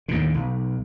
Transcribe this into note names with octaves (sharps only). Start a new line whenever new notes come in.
D#2 A2 D3
B1